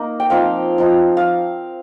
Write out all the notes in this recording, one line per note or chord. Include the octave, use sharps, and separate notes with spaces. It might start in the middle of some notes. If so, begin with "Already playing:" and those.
Already playing: A#3 D#4
G5
F3 C4 D#4 F5
F3 C4 D#4
F5